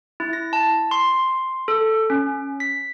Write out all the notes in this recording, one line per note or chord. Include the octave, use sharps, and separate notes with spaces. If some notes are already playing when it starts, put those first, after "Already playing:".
E4
A#6
A5
C6
A4
C#4
B6